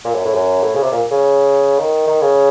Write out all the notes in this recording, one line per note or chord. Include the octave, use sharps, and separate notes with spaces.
A#2
F#2
A2
F#2
A2
C#3
C3
A#2
C#3
D#3
D#3
C#3